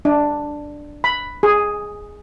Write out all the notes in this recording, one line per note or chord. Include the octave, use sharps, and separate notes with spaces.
D4
B5
G#4